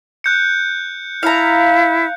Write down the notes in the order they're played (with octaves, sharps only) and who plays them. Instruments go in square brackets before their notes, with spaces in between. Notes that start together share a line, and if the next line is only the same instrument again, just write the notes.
[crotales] F#6 G6 C#7
[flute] E4 [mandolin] F5 A#5